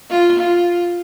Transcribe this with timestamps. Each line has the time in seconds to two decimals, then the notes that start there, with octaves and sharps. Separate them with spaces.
0.10 F4
0.39 F4